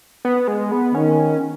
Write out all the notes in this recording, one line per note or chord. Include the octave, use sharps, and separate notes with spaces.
B3
G#3
B3
D#3 C#4